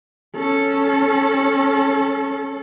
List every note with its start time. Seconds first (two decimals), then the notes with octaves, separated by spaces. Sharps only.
0.36 C#4 A4